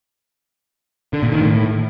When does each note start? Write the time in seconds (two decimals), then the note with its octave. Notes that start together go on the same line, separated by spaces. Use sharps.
1.13 D3
1.23 A#2
1.32 D#3
1.41 A2